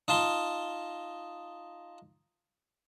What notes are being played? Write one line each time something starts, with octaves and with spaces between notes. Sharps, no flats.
D#4 F4 A5 C6